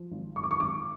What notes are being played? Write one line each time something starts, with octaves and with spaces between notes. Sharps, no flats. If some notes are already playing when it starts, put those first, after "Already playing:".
Already playing: F3
G#1
G#1 C#6
D6
C#6
G#1 D6